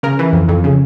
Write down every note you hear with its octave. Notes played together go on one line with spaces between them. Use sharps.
C#3 A#4
E3
F2
F2
C#3